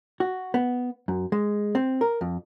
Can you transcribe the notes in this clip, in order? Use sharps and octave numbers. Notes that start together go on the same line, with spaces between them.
F#4
B3
F#2
G#3
C4
A#4
F2